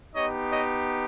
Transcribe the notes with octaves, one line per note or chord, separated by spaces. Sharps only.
B3 D#4 G4 C#5 D#5
C#5 D#5